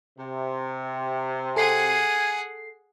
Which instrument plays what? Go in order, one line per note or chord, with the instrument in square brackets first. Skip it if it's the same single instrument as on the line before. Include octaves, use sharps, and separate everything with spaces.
[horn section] C3
[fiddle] G#4 F#5 [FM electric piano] A4 C7 [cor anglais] G#5